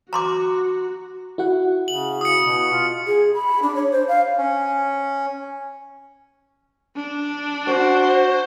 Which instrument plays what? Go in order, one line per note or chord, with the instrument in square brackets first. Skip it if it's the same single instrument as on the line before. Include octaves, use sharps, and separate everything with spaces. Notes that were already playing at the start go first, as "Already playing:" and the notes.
[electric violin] F#4 [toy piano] A#5 C6 D6
[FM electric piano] E4 F#4 F#5
[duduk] C#3 [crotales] F#7
[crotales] D#6 C#7
[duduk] B2
F4
[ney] G#4
B5
D4
C#5
C5
F5
[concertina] C#4
[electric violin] D4
[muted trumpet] F#4 [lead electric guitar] C5